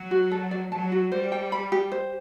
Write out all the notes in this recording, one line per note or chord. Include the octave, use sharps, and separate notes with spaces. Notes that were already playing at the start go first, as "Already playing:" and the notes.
Already playing: F#3
F#4
A4
D5
F#3 A5
F#4
G3 C5
G5
B5
G4
C5